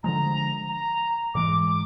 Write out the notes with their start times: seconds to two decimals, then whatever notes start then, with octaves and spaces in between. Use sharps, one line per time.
0.03 D3 F3 G#3 A#5
0.69 A#5
1.34 G#2 E3 G#3 D6
1.67 D6